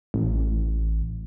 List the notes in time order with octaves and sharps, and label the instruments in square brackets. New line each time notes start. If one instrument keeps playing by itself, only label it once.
[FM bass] A1